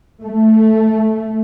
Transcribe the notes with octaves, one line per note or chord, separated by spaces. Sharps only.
A3